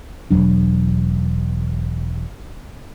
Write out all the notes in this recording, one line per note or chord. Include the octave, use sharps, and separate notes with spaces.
E1 E2 F#3 D4